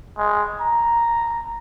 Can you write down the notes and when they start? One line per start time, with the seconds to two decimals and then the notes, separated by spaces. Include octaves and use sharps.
0.17 G#3
0.61 A#5